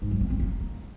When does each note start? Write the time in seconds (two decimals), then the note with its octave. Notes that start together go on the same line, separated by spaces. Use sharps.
0.02 G#2
0.11 F#3
0.21 B3
0.30 C4
0.40 A#3